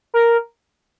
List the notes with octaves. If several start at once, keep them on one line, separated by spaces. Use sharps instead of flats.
A#4